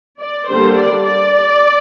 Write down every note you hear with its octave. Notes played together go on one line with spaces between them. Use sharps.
D5
D3 G3 A#3 D4 C5
D5
D5